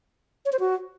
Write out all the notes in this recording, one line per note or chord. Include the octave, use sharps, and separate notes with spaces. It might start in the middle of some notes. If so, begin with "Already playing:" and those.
C#5
C5
F#4